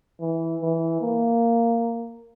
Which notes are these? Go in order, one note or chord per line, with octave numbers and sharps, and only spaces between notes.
E3
E3
A#3